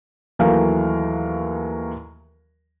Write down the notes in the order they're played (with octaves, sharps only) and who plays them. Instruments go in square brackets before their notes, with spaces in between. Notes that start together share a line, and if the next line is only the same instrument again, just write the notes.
[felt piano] D#2 E3 F#3 A3 A#4 F5